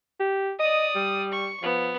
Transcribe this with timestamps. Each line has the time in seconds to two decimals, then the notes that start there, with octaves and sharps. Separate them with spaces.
0.20 G4
0.59 D5 D#5 D#6
0.95 G3
1.32 C#6
1.62 F3 B3